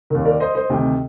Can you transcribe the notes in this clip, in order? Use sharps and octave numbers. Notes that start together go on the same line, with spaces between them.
D#2 D#3 A#4
A#4 D5
C5 D#5
C5 D#5
D2 C3 D#3 D#5 G5